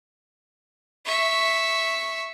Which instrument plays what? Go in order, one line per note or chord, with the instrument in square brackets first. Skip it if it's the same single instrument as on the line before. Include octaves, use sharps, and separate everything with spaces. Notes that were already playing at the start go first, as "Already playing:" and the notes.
[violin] E5 C#6